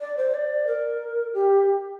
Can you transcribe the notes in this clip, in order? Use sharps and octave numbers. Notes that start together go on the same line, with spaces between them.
D5
C5
D5
A#4
G4